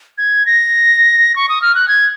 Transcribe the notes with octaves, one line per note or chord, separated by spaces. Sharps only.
G#6
A#6
C#6
D#6
F6
F#6
G#6